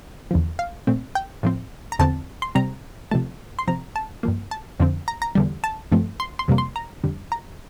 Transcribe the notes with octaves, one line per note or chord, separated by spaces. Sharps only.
E2 D3 F3
F5
A#2 A3 C4
G5
A2 F3 C4
A#5
E2 D3 F3 C4 A5
C6
C3 G3 C4 A#5
C3 F3 A3 A5
C6
C3 F3 C4 A#5
A5
G2 F3 A#3
A5
F2 D3 F3 C4
A#5
A#5
E2 D3 G3
A5
G2 F3 A3 C4
C6
C6
F2 C3 G3 A#3
C6
A#5
F2 D3 G3
A#5